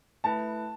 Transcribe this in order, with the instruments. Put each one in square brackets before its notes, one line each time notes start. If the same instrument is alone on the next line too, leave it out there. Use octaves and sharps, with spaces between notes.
[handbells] A3 E4 B4 [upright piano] A5